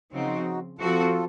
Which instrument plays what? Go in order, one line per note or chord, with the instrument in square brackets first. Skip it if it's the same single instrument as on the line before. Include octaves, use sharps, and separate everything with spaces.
[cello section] C#3 F3 C4 [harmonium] D#4 F#4
[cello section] F3 C4 F#4 [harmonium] F4 A4